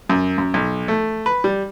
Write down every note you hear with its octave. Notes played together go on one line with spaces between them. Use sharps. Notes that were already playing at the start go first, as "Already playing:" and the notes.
F#2
F#2
B1
A3
B4
G3